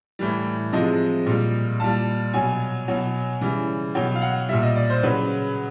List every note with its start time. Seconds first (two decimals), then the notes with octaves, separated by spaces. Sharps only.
0.19 A2 E3 G3
0.72 C3 F3 G#3 D#5
1.26 A#2 G3
1.80 A#2 G3 A5
2.34 B2 F#3 G#5
2.88 B2 F#3
3.41 C#3 E3 G3
3.95 B2 F#3 G5
4.15 F5
4.22 F#5
4.49 A#2 G3 E5
4.63 D#5
4.76 D5
4.90 C5
5.03 C#3 F#3 B4